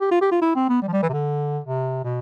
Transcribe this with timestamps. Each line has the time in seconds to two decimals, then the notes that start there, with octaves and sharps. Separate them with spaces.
0.01 G4
0.11 F4
0.21 G4
0.32 F4
0.42 E4
0.56 C4
0.69 B3
0.82 G3
0.88 F3
0.93 G3
1.03 E3
1.09 C3
1.13 D3
1.64 C3
2.04 B2